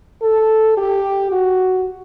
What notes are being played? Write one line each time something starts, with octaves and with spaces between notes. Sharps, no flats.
A4
G4
F#4